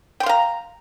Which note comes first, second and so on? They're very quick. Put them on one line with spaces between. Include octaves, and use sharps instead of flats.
G5 C6 F5 A#5